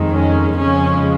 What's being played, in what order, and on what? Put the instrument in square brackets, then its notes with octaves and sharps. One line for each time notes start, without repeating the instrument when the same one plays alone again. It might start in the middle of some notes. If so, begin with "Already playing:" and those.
Already playing: [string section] F2 D#3 G#3
C#4
F2 C#3 F3 G#3 C#4